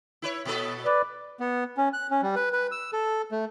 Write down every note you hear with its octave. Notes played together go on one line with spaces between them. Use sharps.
E4 B4 C#5
A#2 B3 A4
B4 D5
B3
C#4
F#6
C#4
G3
B4
B4
E6
A4
A3